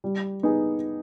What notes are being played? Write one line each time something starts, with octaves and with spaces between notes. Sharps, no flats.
G3
B3 D#4 G#4